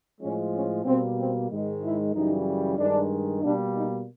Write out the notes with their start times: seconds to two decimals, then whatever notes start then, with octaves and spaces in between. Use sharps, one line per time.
0.21 A2 F3 G#3 C#4
0.53 C#4
0.85 B2 G3 A#3 C4
1.17 C4
1.50 G#2 D#3 G#3
1.82 E4
2.13 F#2 C#3 E3 G3 D#4
2.77 G2 D#3 G#3 D4
3.42 B2 G3 A#3 D4
3.73 D#4